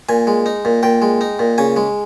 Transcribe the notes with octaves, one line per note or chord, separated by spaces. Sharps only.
A#2 G#5
G#3
D#4
A#2
A#2 G5
G#3
D#4
A#2
C#3 G#5
G#3